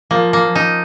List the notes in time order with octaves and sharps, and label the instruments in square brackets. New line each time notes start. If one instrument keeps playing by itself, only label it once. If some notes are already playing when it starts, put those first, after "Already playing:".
[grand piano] F3 [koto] A#3
[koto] A#3
[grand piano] F3
[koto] D#4